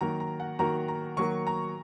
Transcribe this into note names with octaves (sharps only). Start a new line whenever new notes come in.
D#3 F#3 A#3 F#4 A#4 A#5
A#5
F#5
D#3 F#3 A#3 F#4 A#4 A#5
A#5
D#3 F#3 A#3 F#4 A#4 C#6
A#5